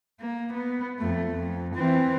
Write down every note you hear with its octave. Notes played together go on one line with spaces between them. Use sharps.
A#3
B3
F2 A3
F2
E3 C4